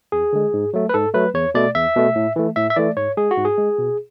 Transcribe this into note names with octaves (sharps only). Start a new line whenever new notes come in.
E2 G#4
D3 G#3
G#2
F#3 A3
B4
G#2 A4
F#3 A3 B4
E2 C#5
B2 A3 D5
E2 E5
B2 A3
A2
E3 A3
A2 E5
E5
E3 A3 D5
G#2 C#5
G#3 G#4
F#4
G#2
G#4
G#3
B2